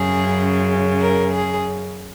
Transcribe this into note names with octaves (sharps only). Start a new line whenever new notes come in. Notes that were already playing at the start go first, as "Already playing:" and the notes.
Already playing: F#2 C#3 G#4
A#4
G#4